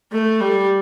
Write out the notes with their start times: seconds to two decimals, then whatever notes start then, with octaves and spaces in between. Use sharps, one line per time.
0.12 A3
0.41 G3